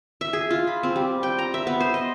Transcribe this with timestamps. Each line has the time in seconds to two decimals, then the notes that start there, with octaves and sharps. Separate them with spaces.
0.21 E5
0.33 G#4
0.50 F4
0.67 B5
0.83 C4
0.96 G3
1.23 G5
1.39 A#5
1.54 E5
1.67 B3
1.80 C5
1.94 D#5